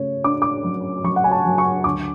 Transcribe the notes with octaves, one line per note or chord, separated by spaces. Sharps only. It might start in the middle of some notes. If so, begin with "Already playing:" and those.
Already playing: C#3 A3 C#5
D4 D6
D6
F#3
F#3 C#6
F#5
G#5
A5
F#3
C#6
D2 D6